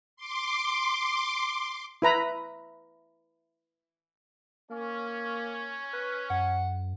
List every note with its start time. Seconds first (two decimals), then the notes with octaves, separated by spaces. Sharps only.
0.16 C6 D6
2.02 E4 B4 A#5 B5
4.70 A#3 C#4
5.93 B4
6.30 F#2 F#5